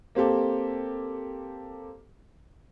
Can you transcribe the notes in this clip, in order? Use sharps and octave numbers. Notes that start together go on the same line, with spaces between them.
A#3 C4 G4 A4